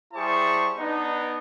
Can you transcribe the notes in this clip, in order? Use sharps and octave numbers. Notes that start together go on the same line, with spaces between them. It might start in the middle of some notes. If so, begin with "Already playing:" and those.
G3 E4 G#4 C5 A5 C#6
B3 D4 D#4